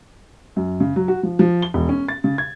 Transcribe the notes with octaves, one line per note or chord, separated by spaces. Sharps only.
F#2
C#3
F#3
F#4
F3
F3
G7
E1
C#4
A6
C#3
G#6